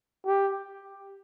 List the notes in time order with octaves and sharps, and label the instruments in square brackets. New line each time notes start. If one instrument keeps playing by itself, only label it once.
[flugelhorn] G4